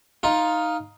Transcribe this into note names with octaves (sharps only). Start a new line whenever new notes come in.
D#4 F4